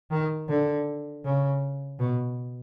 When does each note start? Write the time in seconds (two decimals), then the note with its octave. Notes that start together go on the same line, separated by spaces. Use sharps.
0.11 D#3
0.48 D3
1.24 C#3
1.99 B2